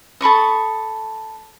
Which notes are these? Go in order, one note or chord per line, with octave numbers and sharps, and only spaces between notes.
A4 B5 C#6 D#6